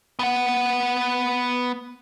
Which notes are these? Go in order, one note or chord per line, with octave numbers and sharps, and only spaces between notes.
B3 F#5